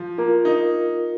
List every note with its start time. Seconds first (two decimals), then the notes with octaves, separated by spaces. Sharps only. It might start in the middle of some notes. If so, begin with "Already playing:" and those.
Already playing: F3
0.18 A#3 F4 A#4
0.45 D#4